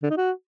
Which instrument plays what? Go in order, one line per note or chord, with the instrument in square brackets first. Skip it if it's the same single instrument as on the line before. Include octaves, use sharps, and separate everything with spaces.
[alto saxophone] D3
D#4
F#4